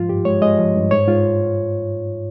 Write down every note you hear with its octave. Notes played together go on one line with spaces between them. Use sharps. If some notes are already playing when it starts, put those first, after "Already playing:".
Already playing: G#2 F3 F4
G2 G4
G#3 C#5
G#3 D#5
F3
G2
G#2 C#5
G#2 F4